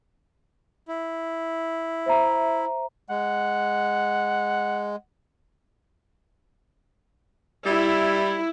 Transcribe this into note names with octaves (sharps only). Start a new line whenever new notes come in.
E4
C5 E5 A#5
G#3 F#5
G3 E4